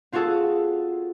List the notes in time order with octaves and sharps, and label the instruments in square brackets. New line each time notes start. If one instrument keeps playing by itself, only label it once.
[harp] C4 F4 F#4 G#4 A4